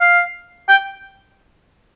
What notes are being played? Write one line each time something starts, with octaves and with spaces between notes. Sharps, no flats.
F5
G5